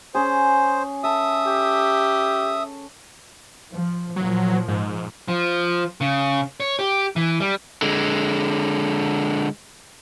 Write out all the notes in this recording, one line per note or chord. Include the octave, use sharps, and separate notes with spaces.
C#4 G#4 C5
A4 E5 D#6
G4
F3
A#2 F3 F#3
G#2
F3
C#3
C#5
G4
E3
G3
D3 G#3